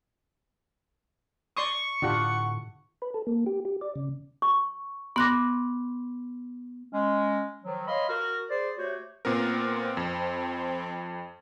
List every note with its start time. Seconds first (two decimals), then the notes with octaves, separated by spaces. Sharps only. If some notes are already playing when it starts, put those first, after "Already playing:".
1.57 D5 C6 C#6 D#6
2.02 A2 D3 D4 F4 G4 F#5
3.02 B4
3.14 A4
3.27 A#3
3.46 G4
3.65 G4
3.81 D5
3.96 C#3
4.42 C#6
5.16 B3 C6 D6 F#6 A#6
6.93 G#3 C#4
7.64 D#3 F3 F#3
7.88 C#5 D#5 F5 B5 C6
8.09 F#4 A#4
8.49 G#4 C5 D5
8.78 A3 F#4 G4 C5 C#5
9.25 A#2 B3 C4 A#4
9.97 F2